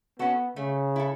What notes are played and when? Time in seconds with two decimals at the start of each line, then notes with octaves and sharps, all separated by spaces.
0.19 B3 C#4 F#4 A4
0.56 C#3 A3
0.96 E4 A4